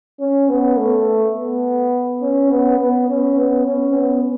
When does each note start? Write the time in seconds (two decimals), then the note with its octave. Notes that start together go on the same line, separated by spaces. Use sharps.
0.19 C#4
0.49 B3
0.77 A3
1.35 B3
2.21 C#4
2.50 B3
2.79 B3
3.08 C#4
3.37 B3
3.65 C#4
3.94 B3